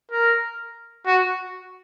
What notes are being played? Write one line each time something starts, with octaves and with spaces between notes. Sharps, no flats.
A#4
F#4